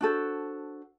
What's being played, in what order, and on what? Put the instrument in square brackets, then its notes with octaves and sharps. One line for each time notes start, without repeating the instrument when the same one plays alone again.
[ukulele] D4 F#4 A4 C5